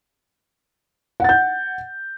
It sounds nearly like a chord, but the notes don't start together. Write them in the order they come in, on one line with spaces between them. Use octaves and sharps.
F#5 A6 G6